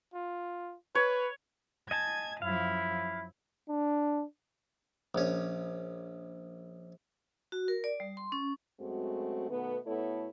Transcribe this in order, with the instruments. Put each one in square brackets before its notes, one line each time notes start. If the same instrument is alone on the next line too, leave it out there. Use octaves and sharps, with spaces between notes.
[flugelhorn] F4
[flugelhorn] B4 [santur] C#5
[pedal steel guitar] D#5 G#5 A5 [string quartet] G#6
[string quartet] F#2 F3 [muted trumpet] E4 [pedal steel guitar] F5
[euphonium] D4
[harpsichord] A#1 C#4
[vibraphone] F#4
A#4
D5
G3
C6
C#4
[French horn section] F#2 G#3 A3 C4 F#4
B2 D#3 A3 B3
B2 A3 B3 E4 A4 C#5